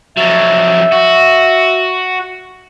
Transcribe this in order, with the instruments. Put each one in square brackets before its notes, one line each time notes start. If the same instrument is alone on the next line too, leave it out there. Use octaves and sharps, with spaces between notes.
[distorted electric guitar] F2 F#3 [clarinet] E5
[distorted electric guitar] F#4